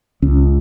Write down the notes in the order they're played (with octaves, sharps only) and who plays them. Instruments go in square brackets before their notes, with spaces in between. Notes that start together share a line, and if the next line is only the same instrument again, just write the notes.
[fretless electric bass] C#2 C#4